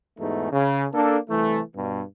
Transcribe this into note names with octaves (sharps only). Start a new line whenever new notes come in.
E2 G#2 B2 A3 D#4
C#3
A#3 D4 A4
C2 E3 A3
G2 B2